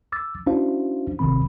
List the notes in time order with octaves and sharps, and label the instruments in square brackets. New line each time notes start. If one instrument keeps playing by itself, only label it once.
[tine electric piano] D6 E6 A6
C#4 D4 E4 F#4 C5 F5
G1 D2 C3 D#3 C4 B5